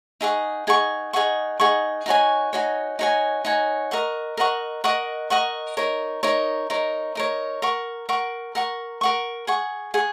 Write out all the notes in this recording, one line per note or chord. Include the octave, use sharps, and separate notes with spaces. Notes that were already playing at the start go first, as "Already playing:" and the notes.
D#4 G#4 F#5 C#6
D#4 G#4 F#5 C#6
D#4 G#4 F#5 C#6
D#4 G#4 F#5 C#6
D#4 F#4 C#5 G#5
D#4 F#4 C#5 G#5
D#4 F#4 C#5 G#5
D#4 F#4 C#5 G#5
A#4 D#5 F#5 C#6
A#4 D#5 F#5 C#6
A#4 D#5 F#5 C#6
A#4 D#5 F#5 C#6
D#4 A#4 C#5
D#4 A#4 C#5
D#4 A#4 C#5
D#4 A#4 C#5
A#4 F#5 C#6
A#4 F#5 C#6
A#4 F#5 C#6
A#4 F#5 C#6
G#4 F#5 C#6
G#4 F#5 C#6